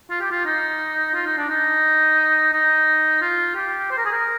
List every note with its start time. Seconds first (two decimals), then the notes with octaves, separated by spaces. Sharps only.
0.10 F4
0.21 G4
0.31 F4
0.45 D#4
1.14 F4
1.26 D#4
1.37 D4
1.49 D#4
2.52 D#4
3.21 F4
3.55 G4
3.91 C5
3.98 A#4
4.05 G#4
4.12 A#4